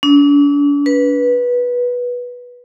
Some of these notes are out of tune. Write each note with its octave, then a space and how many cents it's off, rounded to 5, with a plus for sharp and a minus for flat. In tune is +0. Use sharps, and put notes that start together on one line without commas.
D4 -40
B4 -15